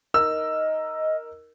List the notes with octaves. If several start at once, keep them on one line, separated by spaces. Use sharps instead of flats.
D#4 A#4 D#5 E6